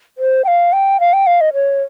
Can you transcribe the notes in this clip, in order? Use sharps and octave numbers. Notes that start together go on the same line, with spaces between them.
C5
G5
F5
G5
F5
G5
F5
D#5
C#5